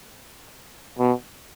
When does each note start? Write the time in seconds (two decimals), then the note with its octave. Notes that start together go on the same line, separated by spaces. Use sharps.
0.99 B2